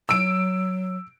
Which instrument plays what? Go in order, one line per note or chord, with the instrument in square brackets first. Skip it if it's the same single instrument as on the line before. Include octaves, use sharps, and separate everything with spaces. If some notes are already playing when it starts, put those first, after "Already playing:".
[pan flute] F#3 [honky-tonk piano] E6 D7